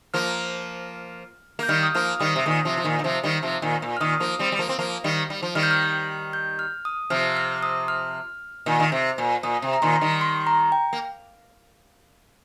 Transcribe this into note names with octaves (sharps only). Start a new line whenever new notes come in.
F3 A#3 F6
A#3 G6
D#3 G3 F6
D#6
F3 A#3 F6
D#3 G3 D#6
C3
A#2 D#3 D#6
C3 F3
F3
A#2 D#3
D#3
C3 F3
D#3 G3
C3 F3
A#2 D#3
A#2
F6
A#2 D#3 D#6
F3 A#3
G3 C4
G3
F3 A#3
C4
F3 A#3
D#3 G3
G3
F3
D#3 G3 F6
G6
F6
G6
F6
D#6
C3 F3 F6
F6
D#6
F6
A#2 D#3
D#3
C3
A#2
A#2 D#6
C3
A#5
A#2 D#3 C6
D#3 G3
C6
A#5
G5
A#3